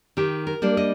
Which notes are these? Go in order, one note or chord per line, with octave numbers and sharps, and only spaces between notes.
D#3 G4
A#4
G3 A#3 D4
D#5